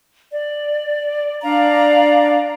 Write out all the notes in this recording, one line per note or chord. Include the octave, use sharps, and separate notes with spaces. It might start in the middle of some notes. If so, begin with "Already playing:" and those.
D5
D4 D5 F5 A#5